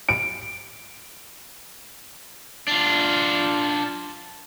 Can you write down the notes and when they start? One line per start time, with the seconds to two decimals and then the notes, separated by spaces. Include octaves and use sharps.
0.09 D7
2.68 D4 F4